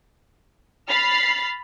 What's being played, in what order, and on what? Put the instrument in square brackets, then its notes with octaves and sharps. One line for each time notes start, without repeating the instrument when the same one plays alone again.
[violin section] B5 F6 A6 C7